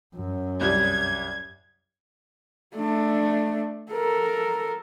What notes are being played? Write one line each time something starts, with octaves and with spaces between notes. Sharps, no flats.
F#2
C2 G3 G#6
A3 D4
A4 A#4